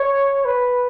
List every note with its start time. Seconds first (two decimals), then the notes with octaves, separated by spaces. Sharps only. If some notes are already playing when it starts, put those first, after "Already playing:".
Already playing: C#5
0.45 B4